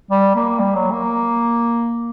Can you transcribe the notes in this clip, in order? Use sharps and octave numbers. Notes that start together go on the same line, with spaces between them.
G3
A#3
G3
F#3
A#3